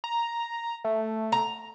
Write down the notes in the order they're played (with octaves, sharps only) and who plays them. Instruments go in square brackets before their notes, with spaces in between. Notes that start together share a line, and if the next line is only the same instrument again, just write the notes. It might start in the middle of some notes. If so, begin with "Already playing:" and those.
[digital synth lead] A#5
A3
[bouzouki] A#5